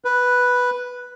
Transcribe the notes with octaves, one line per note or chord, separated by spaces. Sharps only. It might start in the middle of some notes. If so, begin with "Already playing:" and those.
B4